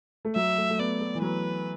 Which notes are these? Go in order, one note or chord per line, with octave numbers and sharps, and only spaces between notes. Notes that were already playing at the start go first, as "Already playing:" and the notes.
A3
F#3 E5
A3
A3
B3 D5
A3
E3
F#3 B4